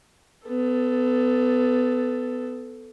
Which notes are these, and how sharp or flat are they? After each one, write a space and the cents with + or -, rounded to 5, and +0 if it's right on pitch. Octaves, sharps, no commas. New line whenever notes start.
B3 +25 A4 +0